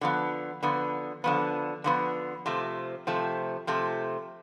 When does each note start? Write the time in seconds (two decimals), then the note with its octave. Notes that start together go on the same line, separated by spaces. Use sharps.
0.01 D3 F3 B3
0.63 D3 F3 B3
1.24 D3 F3 B3
1.84 D3 F3 B3
2.46 C3 F3 A3
3.07 C3 F3 A3
3.67 C3 F3 A3